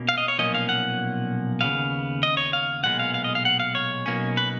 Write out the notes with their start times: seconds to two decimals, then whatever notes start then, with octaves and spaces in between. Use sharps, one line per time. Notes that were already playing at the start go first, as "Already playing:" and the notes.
Already playing: B2 A#3 C#4
0.09 F5
0.18 D#5
0.28 C#5
0.38 B1 A#2 F3 A#3 C#4 D#5
0.54 F5
0.69 F#5
1.61 D#2 C#3 F#3 B3 F5
2.23 D#5
2.37 C#5
2.53 F5
2.83 B1 A#2 G#3 B3 F#5
2.99 F5
3.14 F5
3.24 D#5
3.35 F5
3.45 F#5
3.60 F5
3.75 C#5
4.06 B1 B2 A#3 C#4
4.37 B4